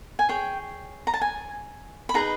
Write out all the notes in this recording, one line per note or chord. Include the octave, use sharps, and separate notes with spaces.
G#5
G#4 C#5 G5
A#5
A5
G#5
B5
D#4 G#4 B4 D#5 A#5